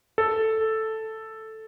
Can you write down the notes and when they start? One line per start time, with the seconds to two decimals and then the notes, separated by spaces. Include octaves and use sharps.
0.18 A4